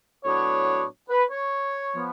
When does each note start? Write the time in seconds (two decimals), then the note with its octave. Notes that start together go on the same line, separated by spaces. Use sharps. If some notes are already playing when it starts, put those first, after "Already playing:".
0.25 A2 F#3 B3 D4 C#5
1.09 B4
1.30 C#5
1.94 F3 B3